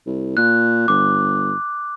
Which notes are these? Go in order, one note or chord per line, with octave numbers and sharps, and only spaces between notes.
C2
A#2 F#6
G1 D6